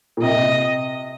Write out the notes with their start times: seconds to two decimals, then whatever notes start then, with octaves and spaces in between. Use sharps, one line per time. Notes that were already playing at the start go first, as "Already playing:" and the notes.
0.17 A#2
0.22 C3 D#5